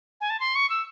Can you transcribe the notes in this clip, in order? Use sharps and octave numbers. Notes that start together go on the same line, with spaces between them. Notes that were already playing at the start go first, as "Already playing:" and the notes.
G#5
A5
C6
C#6
E6